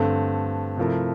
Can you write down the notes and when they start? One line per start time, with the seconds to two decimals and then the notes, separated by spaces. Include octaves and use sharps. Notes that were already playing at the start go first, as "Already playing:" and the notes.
Already playing: G2 D3 A3 C4
0.77 C3 F3 A3 E4 A#4